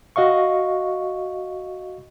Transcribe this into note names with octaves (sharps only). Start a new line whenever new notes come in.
F#4 D#5 F5 C#6